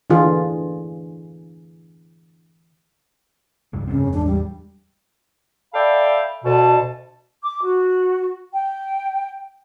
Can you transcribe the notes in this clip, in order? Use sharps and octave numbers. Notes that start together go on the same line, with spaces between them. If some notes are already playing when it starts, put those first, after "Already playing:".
D3 E3 F4 G#4
C#2 G2 G#3
F1 G2 C#3 C4
A1 E2 G#3 D4
G3
A4 D5 E5 F5 G5 B5
D2 B2 A5
D6
F#4
G5